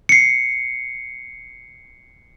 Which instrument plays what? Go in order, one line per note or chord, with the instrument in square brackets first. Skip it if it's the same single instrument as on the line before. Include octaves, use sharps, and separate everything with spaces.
[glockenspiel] C7 C#7